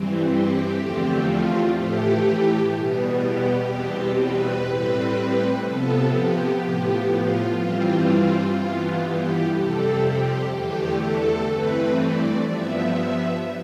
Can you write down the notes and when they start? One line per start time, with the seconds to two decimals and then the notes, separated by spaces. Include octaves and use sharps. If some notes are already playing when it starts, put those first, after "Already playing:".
Already playing: G2 E3 G3 C4
0.25 G4
0.73 E2 D3 F3 A3 C4
1.23 F4
1.71 A2 E3 A3 G4
2.69 E2 B2 G3 B3
3.17 G4
3.66 E2 B2 G3 C4
4.15 B4
4.63 A2 G3 C4
5.61 C3 F3 B3 A4
6.09 G4
6.58 A2 F3 B3 G4
7.07 F4
7.55 G2 E3 G3 C4 F4
8.04 F4
8.53 G2 E3 B3
9.01 G4
9.50 F2 C3 G3 C4 A4
9.99 G4
10.47 E2 D3 A3 G4
10.96 A4
11.45 G2 E3 A3 C4 B4
11.94 D5
12.42 G2 F3 B3 E5